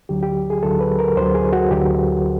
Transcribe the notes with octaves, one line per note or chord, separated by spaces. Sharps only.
D2 D3 F#3 G4
G4
G#4
D2 D3 F#3 A4
B4
A#4
D2 D3 F#3 C5
G#4
F#4
D2 D3 F#3 G4